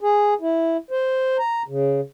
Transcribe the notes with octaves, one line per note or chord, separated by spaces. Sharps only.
G#4
E4
C5
A#5
C#3